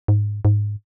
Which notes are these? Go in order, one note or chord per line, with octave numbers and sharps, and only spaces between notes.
G#2
G#2